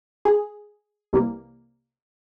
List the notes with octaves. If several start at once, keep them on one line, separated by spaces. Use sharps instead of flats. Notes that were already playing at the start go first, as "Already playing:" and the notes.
G#4
C2 C3 E3 G3 A#3